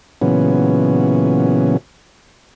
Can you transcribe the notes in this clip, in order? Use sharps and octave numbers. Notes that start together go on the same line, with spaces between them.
A#2 C#3 E3 F#3 B3 C#4